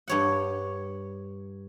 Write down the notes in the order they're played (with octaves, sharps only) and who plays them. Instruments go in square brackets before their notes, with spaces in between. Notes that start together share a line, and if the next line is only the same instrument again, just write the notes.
[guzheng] G2 C#5 F#5